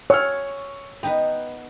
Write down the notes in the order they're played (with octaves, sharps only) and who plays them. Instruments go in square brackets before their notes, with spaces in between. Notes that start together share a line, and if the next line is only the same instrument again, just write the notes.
[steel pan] C#5 [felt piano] C#6 E6 F6
[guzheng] B3 D#4 B4 [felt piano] G5